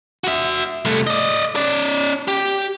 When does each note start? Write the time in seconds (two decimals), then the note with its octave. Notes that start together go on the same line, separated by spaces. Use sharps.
0.24 F#4 E5
0.85 C2 A3
1.07 D5 D#5
1.56 C#4 D5
2.28 G4